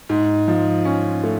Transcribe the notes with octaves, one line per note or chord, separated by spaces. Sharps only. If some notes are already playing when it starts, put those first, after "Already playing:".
G#2
F3
C#4
A3